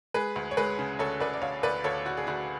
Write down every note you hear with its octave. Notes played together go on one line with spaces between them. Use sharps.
G#3 G#4 B4
D2
C#5
G#3 G#4 B4
C#3
D2 A4 C#5
D2 B4 D5
D5
D2 C#5 F5
D2 B4 D5
D2 A4 C#5
D2 F#4
G#4
D2 F#4